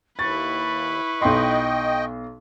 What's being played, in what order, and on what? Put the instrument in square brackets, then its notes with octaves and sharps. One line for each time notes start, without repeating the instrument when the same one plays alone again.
[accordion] D#2 [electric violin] E4 B4 [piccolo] C#6 [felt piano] A6
[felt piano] B1 C6 [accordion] D#5 G5